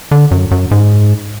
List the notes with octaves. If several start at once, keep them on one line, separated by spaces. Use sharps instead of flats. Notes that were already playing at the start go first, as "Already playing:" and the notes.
D3
F#2
F#2
G#2